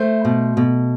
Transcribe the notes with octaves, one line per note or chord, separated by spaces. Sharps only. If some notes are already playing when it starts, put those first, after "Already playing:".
Already playing: A3 C5
B2
B2